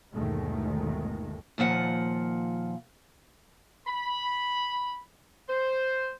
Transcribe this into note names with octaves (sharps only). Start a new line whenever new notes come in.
G1 D#2 B2 D#3 G#3 A3
D#2 A#2 F3 F#5
B5
C5